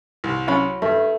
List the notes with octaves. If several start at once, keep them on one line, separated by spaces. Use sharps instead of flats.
C2
F#3 C#4 B5
G2 A3